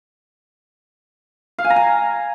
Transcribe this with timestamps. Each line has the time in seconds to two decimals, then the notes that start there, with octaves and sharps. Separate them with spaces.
1.58 F5
1.64 G#5
1.70 A#5
1.76 G#5